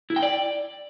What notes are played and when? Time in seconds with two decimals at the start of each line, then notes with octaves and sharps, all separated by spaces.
0.10 E4
0.16 G5
0.23 D5